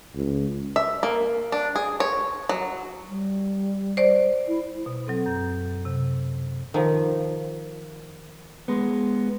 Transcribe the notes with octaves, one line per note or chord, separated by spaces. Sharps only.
C#2
E5
A#3
D4
G#4
C#5
F#3
G3
C5 D5
E4
B2
F#3 C4 A4
F#2 G6
C3
D#3 F3
G#3 B3